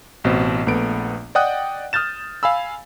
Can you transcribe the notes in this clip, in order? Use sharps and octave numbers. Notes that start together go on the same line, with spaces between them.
A1 B2 C4
A#1 A3 B3 D7
D5 D#5 F#5 G5 D#6 F#6
D#6 F6 G6 A6 E7
F5 G#5 B5 E6